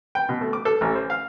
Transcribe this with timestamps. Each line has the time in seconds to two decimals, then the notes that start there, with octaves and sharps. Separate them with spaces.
0.15 G5
0.29 B2
0.41 A3
0.53 D6
0.65 A4
0.81 A1
0.95 C5
1.10 F5